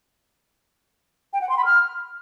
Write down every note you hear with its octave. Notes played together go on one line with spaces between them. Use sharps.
G5
F#5
C6
B5
F6